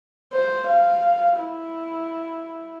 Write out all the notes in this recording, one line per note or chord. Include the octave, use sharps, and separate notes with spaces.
C5
F5
E4